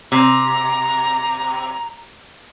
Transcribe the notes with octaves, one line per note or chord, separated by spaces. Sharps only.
C3 A#5